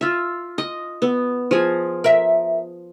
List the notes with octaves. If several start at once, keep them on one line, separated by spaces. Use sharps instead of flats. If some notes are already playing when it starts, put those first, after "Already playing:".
F4 E5
D#5
B3
F3 G#4
A#4 E5